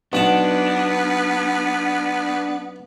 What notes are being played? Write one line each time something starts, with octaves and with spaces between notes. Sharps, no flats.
B1 B3 D4 F#5 A5